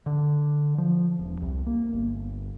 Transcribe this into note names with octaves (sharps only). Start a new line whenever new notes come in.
D3
F3
E1
C2
A#3
G1